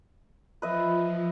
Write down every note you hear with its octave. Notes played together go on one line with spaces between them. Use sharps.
F3 B4 D#5 E5